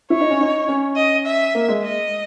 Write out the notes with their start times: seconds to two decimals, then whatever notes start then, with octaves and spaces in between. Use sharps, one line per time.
0.10 E4 C#5
0.20 D#4
0.30 C#4
0.41 D#4
0.68 C#4
0.96 D#5
1.26 E5
1.55 A#3
1.68 G#3
1.83 D#5